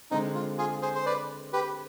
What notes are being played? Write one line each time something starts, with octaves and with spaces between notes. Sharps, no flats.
D3 G#3 C4 D#4
F4
F4 G#4
G#4 C5
C5
B4 D5
G4 B4